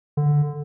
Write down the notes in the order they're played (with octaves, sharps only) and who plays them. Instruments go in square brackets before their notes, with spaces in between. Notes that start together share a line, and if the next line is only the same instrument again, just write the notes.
[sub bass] D3